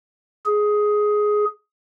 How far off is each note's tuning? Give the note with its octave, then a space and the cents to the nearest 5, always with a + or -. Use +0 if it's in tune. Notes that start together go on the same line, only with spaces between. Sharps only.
G#4 +10